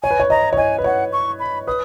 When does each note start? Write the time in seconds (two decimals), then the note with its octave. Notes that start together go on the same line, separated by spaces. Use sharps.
0.03 C#5 G#5
0.11 B4
0.20 C#5
0.30 D#5 A#5
0.53 C#5
0.57 D#5 G#5
0.78 B4
0.84 C#5 F#5
1.13 C#6
1.40 B5
1.67 B4 D#6